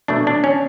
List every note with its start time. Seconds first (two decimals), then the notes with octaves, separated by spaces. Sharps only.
0.08 B2 A3 D4
0.27 D4
0.44 C#4